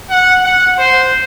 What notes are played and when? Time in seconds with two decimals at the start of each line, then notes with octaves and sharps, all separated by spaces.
0.11 F#5
0.44 F#5
0.79 C5